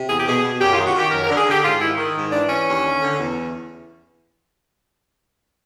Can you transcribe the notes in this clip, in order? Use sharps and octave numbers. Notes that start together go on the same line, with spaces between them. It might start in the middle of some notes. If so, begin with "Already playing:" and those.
Already playing: C3
E2 G#4
G4
B2 G#4
B2
F#2 G4
F4
D#3
F#4
D#3 G4
F#2 A#4
A#4
D3
G#4
D3 G4
G#2 F4
D#3 E4
D#3
G#2
E3 D4
E3 C#4
D#2
D3
D3
E2